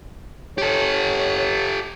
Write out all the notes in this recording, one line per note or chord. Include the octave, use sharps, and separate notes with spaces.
G4 A4 C#5